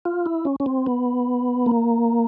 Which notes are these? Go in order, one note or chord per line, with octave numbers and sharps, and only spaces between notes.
F4
E4
C#4
C#4
C4
B3
A#3